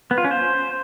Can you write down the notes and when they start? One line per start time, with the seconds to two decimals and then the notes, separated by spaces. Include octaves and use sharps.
0.11 B3
0.18 F4
0.24 C#4
0.31 C5